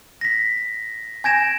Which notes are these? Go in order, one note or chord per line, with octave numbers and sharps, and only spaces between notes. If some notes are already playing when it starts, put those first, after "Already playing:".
A#6 B6
G#5 G6 G#6 A#6 D7 E7